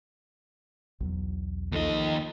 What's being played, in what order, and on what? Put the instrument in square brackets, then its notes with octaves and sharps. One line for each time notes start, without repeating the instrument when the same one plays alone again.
[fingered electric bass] B1 E2 F#3
[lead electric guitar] D#2 D#5 [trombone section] F3 D#4 A4